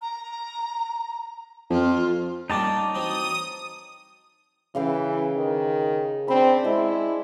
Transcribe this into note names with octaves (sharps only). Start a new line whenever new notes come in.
A#5
F2 F4
G3 A#3 C#4 D#4 A5 D6
E3 F#3 C4 D#6
C#3 E3 F5 G5
D#3
C4 D4 C5 B5
G#3 E4